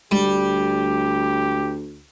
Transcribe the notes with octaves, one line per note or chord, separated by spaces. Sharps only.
D2 G3 G4